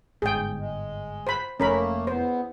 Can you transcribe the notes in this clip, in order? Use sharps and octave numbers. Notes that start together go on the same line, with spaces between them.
G1 G#2 G#4 G5
G#3
C5 B5
F1 A3 A#3 C#4 A#4 B5
E2 B3 C5